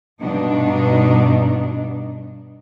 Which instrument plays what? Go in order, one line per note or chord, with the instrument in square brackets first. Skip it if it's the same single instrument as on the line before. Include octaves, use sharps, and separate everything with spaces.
[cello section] G2 B2 D4 D#4